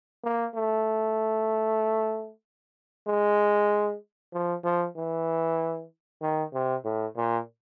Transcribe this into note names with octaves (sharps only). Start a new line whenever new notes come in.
A#3
A3
G#3
F3
F3
E3
D#3
C3
A2
A#2